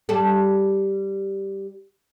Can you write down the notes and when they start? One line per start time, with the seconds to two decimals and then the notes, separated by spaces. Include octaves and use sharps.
0.09 G3 G4 A4